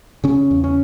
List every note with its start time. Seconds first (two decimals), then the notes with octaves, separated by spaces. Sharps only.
0.24 C#3 C#4
0.51 E2
0.64 C#4